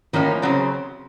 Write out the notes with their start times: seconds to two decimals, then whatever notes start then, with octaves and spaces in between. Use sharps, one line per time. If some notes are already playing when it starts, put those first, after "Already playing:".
0.13 A2 D#3 F3 A#3 C#4 D#4
0.42 C#3 F#3 C4